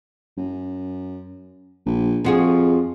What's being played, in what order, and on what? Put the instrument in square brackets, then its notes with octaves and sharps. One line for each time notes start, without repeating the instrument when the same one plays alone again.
[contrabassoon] F#2
A#1
[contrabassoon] F2 [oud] F3 F#4 G#4